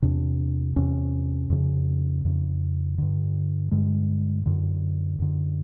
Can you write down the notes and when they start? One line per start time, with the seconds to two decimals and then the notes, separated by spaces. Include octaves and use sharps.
0.02 E2 C3 D4
0.76 E2 C3 C#4
1.50 F2 C#3
2.25 F2 C#3
2.98 G2 D3
3.71 G2 D3 G#3
4.46 F#2 D3
5.19 F#2 D3